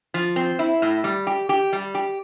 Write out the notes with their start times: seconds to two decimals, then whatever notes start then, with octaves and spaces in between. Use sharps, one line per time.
0.14 F3
0.36 C4
0.59 E4
0.82 A2
1.04 G3
1.27 G4
1.49 G4
1.73 G3
1.95 G4